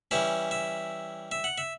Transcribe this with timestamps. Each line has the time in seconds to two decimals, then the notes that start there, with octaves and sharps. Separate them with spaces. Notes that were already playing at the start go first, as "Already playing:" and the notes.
0.11 E3 G3 C#4 E4 E5
0.51 E5
1.32 E5
1.44 F#5
1.58 E5